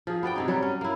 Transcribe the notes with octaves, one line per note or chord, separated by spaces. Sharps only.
F3 G#4
B3 F#4 D5 G5
C3 G#3 D#4
F#3 G3 F#4 C#5
C#4
A#3 E4